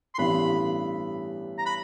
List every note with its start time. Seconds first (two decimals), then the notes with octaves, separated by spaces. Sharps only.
0.15 C6
0.18 A1 G2 E3 G3 B3 B5
1.58 A#5
1.66 B5